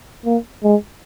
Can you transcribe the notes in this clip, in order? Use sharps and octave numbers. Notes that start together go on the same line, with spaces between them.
A#3
G#3